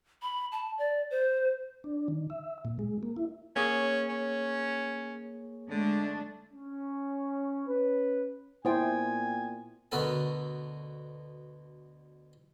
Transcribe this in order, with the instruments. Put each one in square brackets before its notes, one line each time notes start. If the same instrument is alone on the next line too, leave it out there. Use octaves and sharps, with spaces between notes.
[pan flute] B5
A5
D5
C5
[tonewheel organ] D4
D#3
E5
A#2
G#3
A#3
E4
[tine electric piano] A#3 G#4 C#5 [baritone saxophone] C#4
[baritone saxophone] C#4
[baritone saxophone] D3 [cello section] G#3 A3 D4
[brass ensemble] C#4
C#4 B4
[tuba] A#2 [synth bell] B3 F4 G5 [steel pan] E4 C5 [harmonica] G#5
[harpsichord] D2 B2 B3 A4 A#4 A5